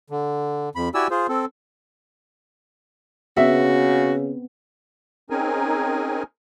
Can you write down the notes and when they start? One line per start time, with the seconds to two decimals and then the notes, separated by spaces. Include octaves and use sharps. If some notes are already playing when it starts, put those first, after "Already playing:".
0.10 D3
0.75 F2 B5
0.94 E4 F#4 G4 D5 G#5 E6
1.10 F4 G#4 C5
1.28 C4 A4
3.37 C#3 B3 C4 F#4 E5
5.30 C4 C#4 D#4 G#4 A#4 G#5